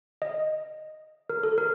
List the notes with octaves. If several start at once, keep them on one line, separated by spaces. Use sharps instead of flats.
D#5
A#4
A4
A#4